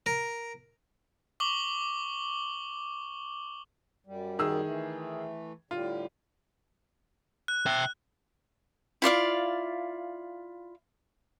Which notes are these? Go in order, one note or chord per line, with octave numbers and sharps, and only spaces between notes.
A#4
C#6 D6 F#7 G7
F#2 G3
D#3 G#4 E6
E3 A3
A2 D3 G3 F4
F#6
E5 G5
E4 F4 D5 F5